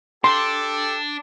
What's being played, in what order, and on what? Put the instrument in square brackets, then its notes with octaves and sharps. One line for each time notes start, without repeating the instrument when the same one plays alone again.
[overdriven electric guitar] D4 [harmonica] G4 A4 [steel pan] C6